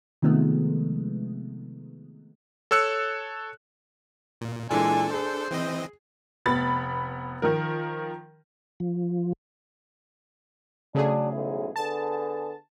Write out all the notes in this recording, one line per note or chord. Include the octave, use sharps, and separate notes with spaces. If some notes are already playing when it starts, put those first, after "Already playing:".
C3 D#3 F3 G#3 A3 B3
A4 C#5 E6 F#6 C#7
A#2
A#2 E3 G#3 D4 A4 G#5
G#4 C5
E3 C4 D#5
F1 B3 B5 A6
D#3 F3 A#4
F3
C#3 F#3 A3 C#4 D4 G#4
B1 G#2 E3
D3 B3 G#4 A5